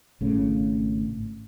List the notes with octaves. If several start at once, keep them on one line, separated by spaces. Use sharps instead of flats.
G#1 A2 C#3